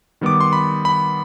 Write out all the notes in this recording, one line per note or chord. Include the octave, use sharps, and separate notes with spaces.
D#3 G3 B3 D6
C6
B5
B5